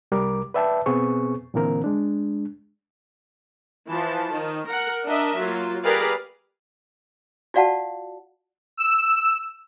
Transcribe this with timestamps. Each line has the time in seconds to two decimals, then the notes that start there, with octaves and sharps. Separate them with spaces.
0.12 C2 G3 A#4 D6
0.54 B4 D5 E5 G5 A5
0.86 B2 B3 C4 G#4 C#6
1.54 A#2 D3 E3 A#3 C4 A#4
1.84 G#3 D4
3.88 E3 F3 A5
4.32 D#3
4.66 A#4 F#5
5.05 D4 A#4 D#5 E5
5.37 F#3 A#3 F4
5.84 G4 G#4 A#4 B4 D5 F5
7.54 F4 F#4 D5 F5 F#5 A5
8.77 E6